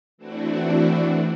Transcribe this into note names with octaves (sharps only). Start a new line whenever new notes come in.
E3 A3 C4 D4 E4 F#4